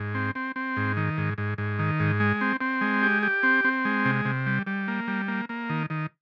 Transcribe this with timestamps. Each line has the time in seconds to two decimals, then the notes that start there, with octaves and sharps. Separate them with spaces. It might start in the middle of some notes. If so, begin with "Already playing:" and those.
Already playing: G#2
0.15 C4
0.35 C4
0.56 C4
0.77 G#2
0.97 D#3
1.18 G#2
1.38 G#2
1.58 G#2
1.79 D#3
2.00 G#2
2.20 G#3
2.41 C4
2.61 C4
2.81 G#3
3.03 G4
3.23 G4
3.43 C4
3.64 C4
3.85 G#3
4.05 C3
4.25 C3
4.46 G3
4.67 G3
4.88 A#3
5.08 G3
5.28 A#3
5.49 A#3
5.69 D#3
5.90 D#3